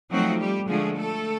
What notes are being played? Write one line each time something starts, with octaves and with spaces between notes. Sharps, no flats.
F3 F#3 A3 C4 D#4 F#4
G3 G4
D3 F3 G#3 A3 G#4
A3 A4